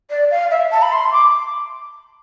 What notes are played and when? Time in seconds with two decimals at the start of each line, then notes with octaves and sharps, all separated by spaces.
0.10 D5
0.31 F5
0.51 E5
0.72 A5
0.82 B5
0.92 C6
1.12 D6